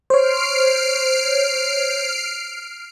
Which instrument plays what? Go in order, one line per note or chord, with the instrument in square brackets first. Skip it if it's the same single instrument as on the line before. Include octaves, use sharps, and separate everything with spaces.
[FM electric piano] C5 C#5 [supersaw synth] F6 C7 D7